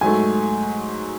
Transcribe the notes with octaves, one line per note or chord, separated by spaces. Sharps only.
G#2 F#3 A3 G#5